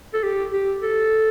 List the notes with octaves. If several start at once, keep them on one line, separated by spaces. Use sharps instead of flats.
A4
G4
G4
A4